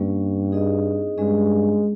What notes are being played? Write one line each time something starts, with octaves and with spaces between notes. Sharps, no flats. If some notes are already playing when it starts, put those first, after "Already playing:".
Already playing: G2 G3 A#3 C#4
C4 D#4 G#4 D#5
G2 G#3 C#4 G#4 D#5